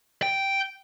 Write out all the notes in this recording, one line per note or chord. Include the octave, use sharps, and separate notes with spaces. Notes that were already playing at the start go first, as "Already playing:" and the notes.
G5